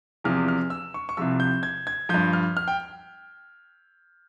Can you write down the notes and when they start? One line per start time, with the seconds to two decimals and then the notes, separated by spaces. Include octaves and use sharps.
0.24 E2 C3 F3 F6
0.48 F6
0.70 E6
0.94 C#6
1.09 C#6
1.17 C2 C3 F3 E6
1.40 G6
1.63 G#6
1.87 G#6
2.09 G2 F3 G6
2.33 F6
2.57 F6
2.68 G5